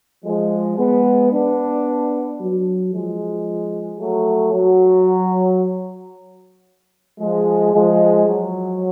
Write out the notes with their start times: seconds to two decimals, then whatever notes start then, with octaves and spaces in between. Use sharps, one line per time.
0.24 F3 G#3
0.78 G#3 B3
1.31 B3 D4
2.38 F#3
2.92 F3 G#3
3.99 F#3 A3
4.53 F#3
7.20 F3 G#3
7.74 F3 G#3
8.27 F#3